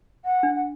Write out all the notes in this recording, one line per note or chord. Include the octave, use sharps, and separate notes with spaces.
F#5
D4
F#5